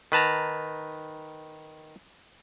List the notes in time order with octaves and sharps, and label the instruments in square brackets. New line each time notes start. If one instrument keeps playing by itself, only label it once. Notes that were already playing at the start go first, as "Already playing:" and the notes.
[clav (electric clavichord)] D#3 B4 A5 A#5